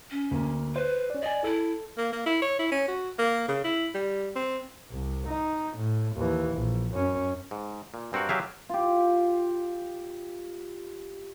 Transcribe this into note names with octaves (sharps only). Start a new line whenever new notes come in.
C#4
D2 A#3
B4 C5
C#4 D5
D5 D#5 G#5
E4 A4
A#3
A#3
E4
C#5
E4
C#4
F#4
A#3
C#3
E4
G3
C4
C2
D#4
A2
D#2 E3
A#1
F#2 C#4
G#2
A#2
G2 C4 F#4 A#4 F#5
F#3 G4 G#4 E5 F5
F4 G4